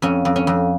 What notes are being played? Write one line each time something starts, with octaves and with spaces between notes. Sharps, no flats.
F2 C#4
F2
C#4
F2